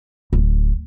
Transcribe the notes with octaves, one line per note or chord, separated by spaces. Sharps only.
D1